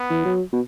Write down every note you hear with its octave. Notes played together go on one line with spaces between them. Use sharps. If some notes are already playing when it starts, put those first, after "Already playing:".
Already playing: B3
E3
F#3
B2